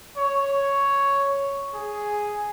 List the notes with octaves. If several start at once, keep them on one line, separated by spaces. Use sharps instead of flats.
C#5
G#4